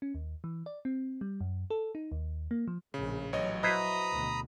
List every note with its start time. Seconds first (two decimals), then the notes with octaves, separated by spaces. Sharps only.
0.02 C#4
0.15 D#2
0.44 E3
0.66 D5
0.85 C4
1.21 G3
1.40 F#2
1.70 A4
1.95 D#4
2.12 D#2
2.51 A#3
2.68 F3
2.94 A#1 A2 C#3
3.33 A1 F#3 C#5 D#5
3.63 E4 F#4 B4 C5 D#5 A#5 B5 D#6
4.11 D2 B2